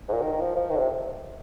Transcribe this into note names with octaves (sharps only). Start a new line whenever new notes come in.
G#2
A#2
D#3
D#3
F3
F3
D#3
D3
C3